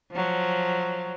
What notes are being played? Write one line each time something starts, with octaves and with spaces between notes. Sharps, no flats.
F3 F#3